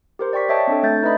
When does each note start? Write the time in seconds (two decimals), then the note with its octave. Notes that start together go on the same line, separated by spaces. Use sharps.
0.19 G4 A#4 C5
0.33 D5 G5 C#6 B6
0.49 C#5 D#5 E5 G5 A5 C#6
0.67 C4 D4 A4
0.83 A3 E5 G6 A6
1.03 D#4 B4 D5 D#5 B5